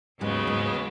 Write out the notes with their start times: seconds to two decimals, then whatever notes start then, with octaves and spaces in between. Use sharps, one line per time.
0.21 D#2 G#2 C#3 F#3 G#3 B3
0.47 G#2 G#3
0.74 G#3